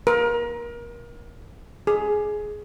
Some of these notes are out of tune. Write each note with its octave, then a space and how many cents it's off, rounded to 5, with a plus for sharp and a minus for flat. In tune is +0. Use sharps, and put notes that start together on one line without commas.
A#4 +30
G#4 +15